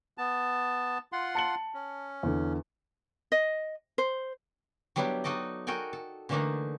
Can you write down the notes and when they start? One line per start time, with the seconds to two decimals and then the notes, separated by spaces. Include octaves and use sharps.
0.18 B3 A5
1.12 F4 F#5 C6
1.35 A5 C#7 F#7
1.74 C#4
2.23 E2 D3
3.32 D#5
3.98 C5
4.96 F#3 G3 B3 D4 E4 G4
5.24 D#4 F#4 A4 D5 D#5
5.67 F#4 A4 A#4 G5 G#5
5.93 A4
6.29 D3 E3 A3 A#3 D4 D#4